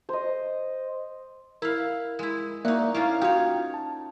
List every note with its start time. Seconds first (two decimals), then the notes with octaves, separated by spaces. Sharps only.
0.09 C5 D#5
1.62 E4 A#4 F5
2.19 G#3 E4
2.65 A#3 D#4 F#4 D5 E5
2.94 A#3 C#4 E4 F4
3.21 D#4 F4 F#4 C#5 G5
3.74 A5